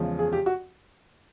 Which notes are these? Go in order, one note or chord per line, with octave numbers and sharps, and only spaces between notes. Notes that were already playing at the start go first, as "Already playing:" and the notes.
Already playing: E2 C#3 F3 G#3
G#4
G4
F#4